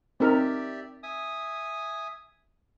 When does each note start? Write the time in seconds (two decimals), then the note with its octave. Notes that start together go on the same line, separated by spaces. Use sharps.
0.20 C4 D#4 G4 A#4 D5 E5
1.03 E5 G#5 D#6